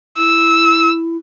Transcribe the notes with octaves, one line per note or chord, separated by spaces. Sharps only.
E4 E6